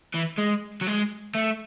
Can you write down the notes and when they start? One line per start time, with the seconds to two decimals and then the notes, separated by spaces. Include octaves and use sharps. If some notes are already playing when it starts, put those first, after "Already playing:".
0.14 E3
0.38 G#3
0.81 F#3
0.87 G#3
1.35 A3